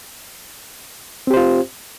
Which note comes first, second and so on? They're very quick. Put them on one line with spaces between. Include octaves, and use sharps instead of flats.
C4 G4 C5 F4